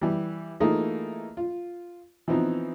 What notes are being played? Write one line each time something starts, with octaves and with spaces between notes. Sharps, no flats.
E3 G3
E3 A3 A#3 D#4 F4 G#4
F4
E3 F3 B3 C4 D#4